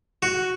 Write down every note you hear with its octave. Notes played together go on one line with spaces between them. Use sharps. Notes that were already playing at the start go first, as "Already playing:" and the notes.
F#4